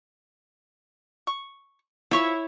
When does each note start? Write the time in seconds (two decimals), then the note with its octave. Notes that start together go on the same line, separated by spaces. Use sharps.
1.27 C#6
2.11 F3 E4 C#5 E5 C#6